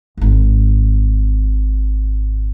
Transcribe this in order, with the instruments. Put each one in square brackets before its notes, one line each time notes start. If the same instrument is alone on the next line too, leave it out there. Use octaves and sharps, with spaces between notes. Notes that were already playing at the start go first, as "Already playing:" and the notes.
[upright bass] D1 G#1